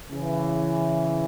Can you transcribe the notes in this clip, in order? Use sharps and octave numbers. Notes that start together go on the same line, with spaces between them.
C#3 E3